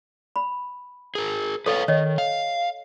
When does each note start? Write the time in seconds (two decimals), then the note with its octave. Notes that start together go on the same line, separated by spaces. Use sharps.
0.36 B5
1.15 G#4 A#4
1.66 A4 B4 C#5 F5
1.88 D#3 C#5 D#5
2.18 F5